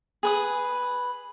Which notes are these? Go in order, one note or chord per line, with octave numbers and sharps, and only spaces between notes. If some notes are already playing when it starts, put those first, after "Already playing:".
G#4 B4 D#6